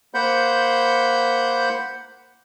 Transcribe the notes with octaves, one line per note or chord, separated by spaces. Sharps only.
A#3 C5 F#5 B5 G6